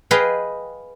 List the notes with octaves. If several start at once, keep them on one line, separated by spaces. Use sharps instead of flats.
G#4 B4 D#5 F5 G5